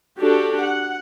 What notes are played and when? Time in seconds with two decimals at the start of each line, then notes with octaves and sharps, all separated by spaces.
0.19 D4 F#4 G4 A4
0.61 F#5